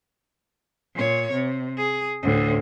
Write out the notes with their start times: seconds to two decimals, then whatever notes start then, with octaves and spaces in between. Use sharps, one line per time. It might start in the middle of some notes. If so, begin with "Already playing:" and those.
0.95 A#2 C#5
1.32 C3
1.78 G#4
2.22 D2 A2